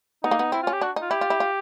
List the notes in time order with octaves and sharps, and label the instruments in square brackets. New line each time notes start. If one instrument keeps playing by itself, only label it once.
[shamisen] B3 [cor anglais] D#4
[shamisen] A#3
B3
[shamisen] C4 [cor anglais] E4
[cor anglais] F4
[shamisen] C#4
[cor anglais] G4
[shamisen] D4 [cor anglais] F#4
[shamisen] D#4
[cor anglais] F4
[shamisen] E4 [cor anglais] G4
[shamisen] F4
E4
F4